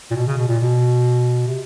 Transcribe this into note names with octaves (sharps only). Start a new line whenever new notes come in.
A#2
B2
C#3
B2
A#2
B2
C3